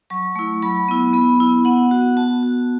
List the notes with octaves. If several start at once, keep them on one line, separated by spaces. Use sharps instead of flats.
F#3 C#6
A3 E4
F#3 B5
B3 E4
B3 B5
E4
B3 F#5
F#4
B3 A5
F#4